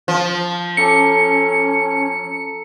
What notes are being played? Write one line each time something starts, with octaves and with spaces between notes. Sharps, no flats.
F3
C#4 A4 A#5 D6 C#7